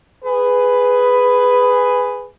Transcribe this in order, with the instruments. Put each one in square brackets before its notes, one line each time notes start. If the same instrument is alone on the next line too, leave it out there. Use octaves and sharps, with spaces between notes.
[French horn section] G#4 B4